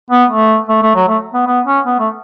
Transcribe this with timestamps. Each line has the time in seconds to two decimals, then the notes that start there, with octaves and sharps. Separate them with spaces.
0.10 B3
0.30 A3
0.69 A3
0.82 A3
0.95 F#3
1.08 A3
1.34 B3
1.47 B3
1.66 C#4
1.86 B3
1.99 A3